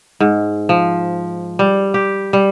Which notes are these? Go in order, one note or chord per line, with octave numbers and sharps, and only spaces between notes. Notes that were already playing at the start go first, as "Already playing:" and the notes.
G#2
F3
G3
G4
G3